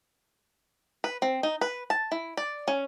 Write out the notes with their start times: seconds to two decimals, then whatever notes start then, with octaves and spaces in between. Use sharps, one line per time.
1.04 B4
1.22 C4
1.43 D#4
1.61 B4
1.90 A5
2.12 E4
2.37 D5
2.68 C#4